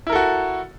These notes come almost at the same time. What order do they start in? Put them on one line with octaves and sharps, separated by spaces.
E4 A#4 A4 F#4